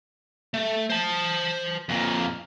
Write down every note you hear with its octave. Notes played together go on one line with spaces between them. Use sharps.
A3
C5 A5
F2 A#2